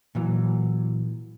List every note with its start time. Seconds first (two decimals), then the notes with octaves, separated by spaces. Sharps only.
0.15 A#2 E3 F#3